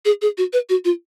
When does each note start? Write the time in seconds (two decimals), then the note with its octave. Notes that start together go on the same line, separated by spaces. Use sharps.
0.05 G#4
0.22 G#4
0.38 F#4
0.53 B4
0.69 F#4
0.85 F4